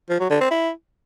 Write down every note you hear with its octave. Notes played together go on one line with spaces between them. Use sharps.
F3
F#3
D3
C4
E4